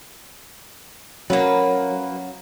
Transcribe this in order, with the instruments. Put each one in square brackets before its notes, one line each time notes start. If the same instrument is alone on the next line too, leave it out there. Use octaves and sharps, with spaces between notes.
[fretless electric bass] F#3 [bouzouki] A#3 B4 [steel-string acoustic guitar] C#4 F#5